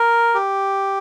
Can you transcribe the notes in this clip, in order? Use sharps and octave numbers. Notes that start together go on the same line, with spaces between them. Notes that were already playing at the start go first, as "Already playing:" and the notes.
Already playing: A#4
G4